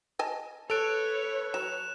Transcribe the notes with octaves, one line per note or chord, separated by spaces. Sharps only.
D#5 G#5 A5
A4 B4 C#5 F#6 D7 F7
F#3 E7